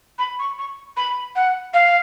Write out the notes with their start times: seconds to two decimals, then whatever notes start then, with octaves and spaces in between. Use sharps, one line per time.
0.19 B5
0.39 C#6
0.59 C#6
0.97 B5
1.36 F#5
1.74 F5